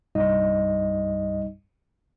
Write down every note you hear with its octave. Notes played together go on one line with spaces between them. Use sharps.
C2 G2 G3 D#4 D#5